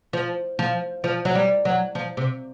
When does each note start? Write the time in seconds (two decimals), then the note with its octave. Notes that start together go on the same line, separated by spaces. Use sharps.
0.13 F3
0.59 F3
1.04 F3
1.25 F#3
1.35 G3
1.65 F#3
1.95 F3
2.17 C3